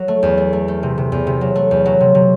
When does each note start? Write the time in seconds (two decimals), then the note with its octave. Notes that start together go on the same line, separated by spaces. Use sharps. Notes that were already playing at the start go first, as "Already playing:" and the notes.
Already playing: F#3
0.08 A3
0.23 E2
0.38 A3
0.53 A3
0.68 A3
0.83 C3
0.98 C3
1.12 E2
1.27 C3
1.41 F#3
1.55 A3
1.71 E2
1.86 F#3
2.01 C3
2.15 C3